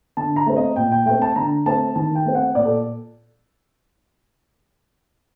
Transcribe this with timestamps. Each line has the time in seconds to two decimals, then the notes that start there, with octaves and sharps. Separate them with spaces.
0.17 D3 A5
0.36 A#5
0.46 A3 C4
0.56 D#5
0.76 A#2 G5
0.92 G5
1.06 A3 C4 G5
1.22 A5
1.36 D3 A#5
1.66 A3 C4 A5
1.95 D#3 A5
2.15 G5
2.25 A3 C4
2.35 F#5
2.55 A#2 D5
2.65 A4